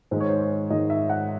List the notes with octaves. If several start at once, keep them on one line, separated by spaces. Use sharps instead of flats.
G#2 D#3 G#3 C5
C#5
C5
C#5
G#2 D#3 G#3 D#5
E5
F#5